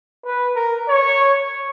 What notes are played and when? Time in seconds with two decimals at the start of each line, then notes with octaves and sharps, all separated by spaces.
0.25 B4
0.56 A#4
0.89 C#5